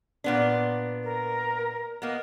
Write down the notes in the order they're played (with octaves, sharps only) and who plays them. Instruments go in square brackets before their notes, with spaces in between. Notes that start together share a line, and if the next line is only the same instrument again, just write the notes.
[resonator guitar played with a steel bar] A#2 B3 D4
[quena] A#4
[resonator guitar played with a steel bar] A#3 B3 [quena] D#5